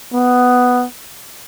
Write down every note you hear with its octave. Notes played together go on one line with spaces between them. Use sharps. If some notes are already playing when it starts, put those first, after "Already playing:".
B3